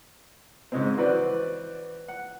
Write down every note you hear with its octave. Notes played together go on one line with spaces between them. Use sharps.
G#2 C#3 G#3 C4
E3 F#4 B4 C5 D5
F#5